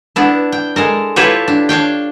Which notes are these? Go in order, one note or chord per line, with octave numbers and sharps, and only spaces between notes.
B3 D4 E4
G5
G#3 A4 A#4
E4 F4 G4 A4 B4 C#5
D4
D4 C#5 F5 G5